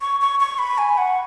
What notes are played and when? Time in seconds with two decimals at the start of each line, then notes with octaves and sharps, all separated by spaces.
0.01 C#6
0.21 C#6
0.40 C#6
0.59 B5
0.78 G#5
0.98 F#5